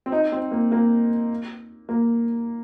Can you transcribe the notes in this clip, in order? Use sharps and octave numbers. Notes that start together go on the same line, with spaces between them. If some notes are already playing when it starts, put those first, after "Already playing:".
C4
D#4
C4
A#3
A#3
A#3